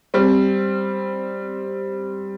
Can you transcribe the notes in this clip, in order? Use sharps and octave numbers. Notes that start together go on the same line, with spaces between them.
G3 C4